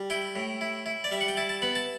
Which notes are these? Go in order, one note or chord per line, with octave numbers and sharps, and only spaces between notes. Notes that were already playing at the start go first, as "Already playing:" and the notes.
Already playing: G3
E4 G5
A2
E4
E4
D5
G3 E5
F#5
G5
E4 A5
A5
B3 B5
A5